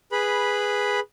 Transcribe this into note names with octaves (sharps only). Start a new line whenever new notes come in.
G#4 B4 B5